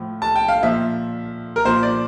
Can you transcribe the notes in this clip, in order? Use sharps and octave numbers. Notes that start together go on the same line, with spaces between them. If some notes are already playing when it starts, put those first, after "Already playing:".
Already playing: A2 F3
A5
G5
F5
A#2 F3 E5
A#4
A#2 F3 C5
D5